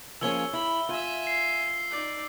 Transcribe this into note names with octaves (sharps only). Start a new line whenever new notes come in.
F3 A#3 C#4 G#4 C#5 E6 G7
E4 B5
F4 E5 G#5
C7
D#4 D5